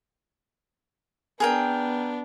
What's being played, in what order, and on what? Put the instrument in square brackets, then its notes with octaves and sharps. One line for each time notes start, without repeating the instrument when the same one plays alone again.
[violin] B3 D4 [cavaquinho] G#4 A#4 G5